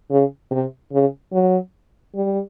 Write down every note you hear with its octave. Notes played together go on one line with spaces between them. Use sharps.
C#3
C3
C#3
F#3
G3